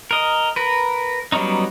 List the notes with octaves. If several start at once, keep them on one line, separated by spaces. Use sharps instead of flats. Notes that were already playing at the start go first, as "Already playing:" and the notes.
A#4 D#5
A#4 B4
F#3 G3 B3 C#4 D#4